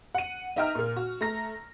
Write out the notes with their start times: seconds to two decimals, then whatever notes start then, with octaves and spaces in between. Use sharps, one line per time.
0.14 F#5 D#7
0.56 D#4 D#5 E5 G5 A#5 F6
0.75 A#2 A#3
0.96 F#4
1.21 A3 A#5 A#6